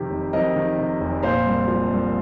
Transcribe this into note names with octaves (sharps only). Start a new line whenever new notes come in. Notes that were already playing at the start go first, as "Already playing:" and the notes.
Already playing: F2 C3 D#3 G4
F1
F2 A#4 D#5
D#3
C3
F1
A#2 C5 F5
C2
F3
C2